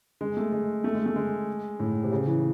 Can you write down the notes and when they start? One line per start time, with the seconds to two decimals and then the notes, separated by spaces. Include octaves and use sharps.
0.21 G#3
0.37 A3
0.52 G#3
0.84 A3
0.95 G#3
1.06 A3
1.16 G#3
1.79 A2
2.04 C3
2.12 C#3
2.27 E3